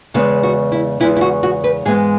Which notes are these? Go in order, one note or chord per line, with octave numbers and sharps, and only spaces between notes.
E2 C#3 G#3 B3
F#4
E4
E2 C#3 G#3 B3 E4
E4
F#4
F#4
B4
G#2 E3 G#3 B3 G#4